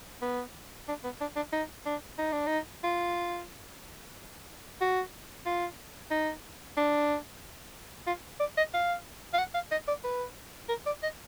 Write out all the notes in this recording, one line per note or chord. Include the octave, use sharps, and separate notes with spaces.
B3
D4
B3
D4
D4
D#4
D4
D#4
D4
D#4
F4
F#4
F4
D#4
D4
F4
D5
D#5
F5
F5
F#5
F5
D#5
D5
B4
A#4
D5
D#5